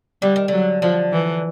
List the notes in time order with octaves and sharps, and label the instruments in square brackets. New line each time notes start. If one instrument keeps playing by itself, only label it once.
[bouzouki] D3 [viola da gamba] G3
[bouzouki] D#3
[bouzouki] D3 [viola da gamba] F#3
[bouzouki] D3 [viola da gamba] F3
[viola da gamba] E3